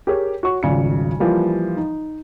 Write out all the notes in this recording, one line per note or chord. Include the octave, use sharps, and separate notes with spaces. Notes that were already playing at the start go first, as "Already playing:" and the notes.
G4 G#4 A#4 C#5
F#4 C#5 C#6
D#1 G#1 C#3 F3 D5 C#7
E3 F3 G3 A#3
D#4